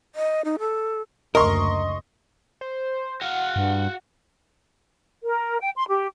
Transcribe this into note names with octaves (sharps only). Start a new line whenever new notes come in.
D#5
D#4
A4
F#1 D2 A#4 D#5 C6 C#6
C5
F#4 F5 F#5
G2
A#4
G5
C6
G4